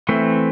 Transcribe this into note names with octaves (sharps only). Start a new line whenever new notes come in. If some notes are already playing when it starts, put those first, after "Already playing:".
E3 A3 C4